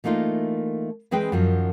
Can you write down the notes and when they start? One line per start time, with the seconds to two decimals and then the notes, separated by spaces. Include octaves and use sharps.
0.04 E3 A3 A#3 D#4 F4
1.11 E3 G#3 C4 G#4 B4 G5
1.32 F#2 D#3 F3 F#3